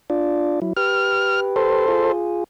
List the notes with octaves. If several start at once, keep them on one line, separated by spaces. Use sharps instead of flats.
D4 F4 D5
F#3 E4
G4 B4 F6
A4 C5
F4 G#4